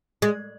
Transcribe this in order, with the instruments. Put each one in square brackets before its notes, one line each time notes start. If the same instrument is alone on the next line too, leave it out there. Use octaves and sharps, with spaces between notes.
[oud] G#3